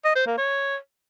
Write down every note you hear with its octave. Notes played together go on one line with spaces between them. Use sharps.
D#5
C5
A#3
C#5